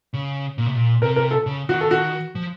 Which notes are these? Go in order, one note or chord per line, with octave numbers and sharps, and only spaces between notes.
C#3
A#2
C3
A#2
C3 A#4
A#4
A4
C#3
D#3 F#4
A4
F#4
F3